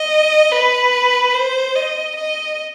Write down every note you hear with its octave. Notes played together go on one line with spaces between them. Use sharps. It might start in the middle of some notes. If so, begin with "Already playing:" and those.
Already playing: D#5
B4
C5
D#5
D#5